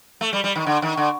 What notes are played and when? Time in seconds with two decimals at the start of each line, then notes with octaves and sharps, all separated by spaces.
0.21 A3
0.33 G3
0.44 G3
0.56 D#3
0.66 D3
0.82 D#3
0.97 D3